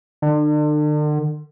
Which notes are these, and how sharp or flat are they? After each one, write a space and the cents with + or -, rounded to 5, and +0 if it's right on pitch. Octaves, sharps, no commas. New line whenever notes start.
D3 +40